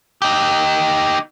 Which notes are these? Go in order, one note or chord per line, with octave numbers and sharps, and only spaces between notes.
D#4 G4